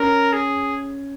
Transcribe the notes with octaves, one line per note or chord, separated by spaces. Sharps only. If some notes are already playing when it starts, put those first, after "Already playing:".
Already playing: C#4 A#4
G#4